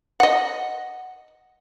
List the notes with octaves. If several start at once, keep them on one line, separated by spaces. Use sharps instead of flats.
D#5 F#5